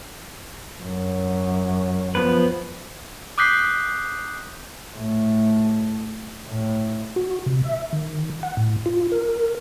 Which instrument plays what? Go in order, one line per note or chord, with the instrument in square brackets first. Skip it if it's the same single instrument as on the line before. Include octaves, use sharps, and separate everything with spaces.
[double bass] F#2
[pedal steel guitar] F3 B3 B4
[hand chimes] D6 D#6 F#6 G6 B6 C7
[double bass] A2 A3
A2
[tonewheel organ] F#4
C3
E5
D#3
F#5
A2
F4
A#4